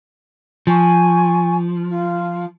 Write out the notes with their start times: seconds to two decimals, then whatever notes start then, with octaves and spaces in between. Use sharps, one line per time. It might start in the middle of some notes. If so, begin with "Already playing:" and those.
0.67 F3 G#5 C#6
1.87 F4